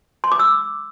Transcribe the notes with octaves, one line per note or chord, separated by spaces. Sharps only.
C6
D6
E6